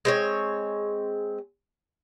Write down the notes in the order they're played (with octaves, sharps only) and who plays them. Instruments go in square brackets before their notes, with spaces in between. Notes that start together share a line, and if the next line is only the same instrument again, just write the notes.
[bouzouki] G#3 C4 C#5